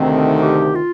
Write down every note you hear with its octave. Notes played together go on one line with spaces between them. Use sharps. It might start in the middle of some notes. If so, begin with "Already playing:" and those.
Already playing: D2 C3 D#3 A3 C4
G4
F4